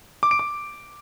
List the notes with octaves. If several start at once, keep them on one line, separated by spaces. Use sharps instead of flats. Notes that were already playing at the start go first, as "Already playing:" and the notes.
D6
D7
D6